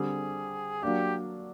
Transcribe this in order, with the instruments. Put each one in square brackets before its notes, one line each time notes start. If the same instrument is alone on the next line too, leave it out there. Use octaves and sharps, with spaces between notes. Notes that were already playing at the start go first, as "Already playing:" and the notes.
Already playing: [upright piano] D3 G3 C4 [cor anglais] G#4
[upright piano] F#3 A#3 D4 [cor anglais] G4